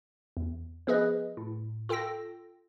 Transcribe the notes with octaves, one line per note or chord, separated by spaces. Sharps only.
E2
F3 B3 G#4 B4 D#5
A2
F4 A4 G5 E6 A#6